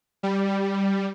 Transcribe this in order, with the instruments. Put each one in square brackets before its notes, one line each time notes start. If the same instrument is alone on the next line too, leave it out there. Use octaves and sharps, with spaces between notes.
[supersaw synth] G3